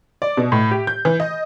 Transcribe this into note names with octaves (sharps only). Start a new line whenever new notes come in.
D5
B2
A2
G4
G6
E3
D#5